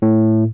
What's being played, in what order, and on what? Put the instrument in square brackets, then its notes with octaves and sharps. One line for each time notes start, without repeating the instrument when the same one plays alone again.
[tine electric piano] A2